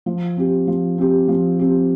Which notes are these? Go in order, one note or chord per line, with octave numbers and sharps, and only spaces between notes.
F3
C4 G4
F3
C4 G4
F3
C4 G4